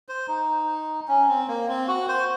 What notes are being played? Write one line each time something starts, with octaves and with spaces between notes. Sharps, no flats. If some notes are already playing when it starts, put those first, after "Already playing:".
C5
D#4
C#4
C4
A#3
C4
F#4
C5